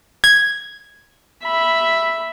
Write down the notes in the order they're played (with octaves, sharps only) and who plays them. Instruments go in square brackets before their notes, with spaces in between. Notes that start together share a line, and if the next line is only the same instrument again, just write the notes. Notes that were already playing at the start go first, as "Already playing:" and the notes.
[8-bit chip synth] G#6
[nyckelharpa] E5 B5